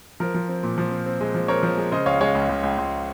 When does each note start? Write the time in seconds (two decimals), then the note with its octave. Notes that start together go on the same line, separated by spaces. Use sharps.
0.20 F3 A#4
0.34 F3
0.49 C4
0.63 A#2
0.78 F3
0.91 C4
1.06 C4
1.21 G#3
1.35 F3
1.48 C4 A#4 C#5
1.63 F3
1.78 G#3
1.92 C#3 C5 D#5
2.06 C#2 C#5 F5
2.20 G#3 C#5 F5
2.35 C#2
2.49 C#2
2.63 C#2
2.78 C#2